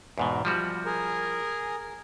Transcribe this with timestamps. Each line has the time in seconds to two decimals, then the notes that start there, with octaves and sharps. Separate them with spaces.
0.18 E2 G#2 B2
0.45 F3 G3 F#4
0.85 G#4 A#4